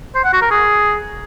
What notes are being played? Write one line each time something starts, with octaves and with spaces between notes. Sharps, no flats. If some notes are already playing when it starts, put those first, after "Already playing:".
C5
F#5
F#4
A#4
G#4